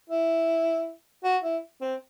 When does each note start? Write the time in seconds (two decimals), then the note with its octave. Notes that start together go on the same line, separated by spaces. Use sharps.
0.09 E4
1.24 F#4
1.43 E4
1.81 C4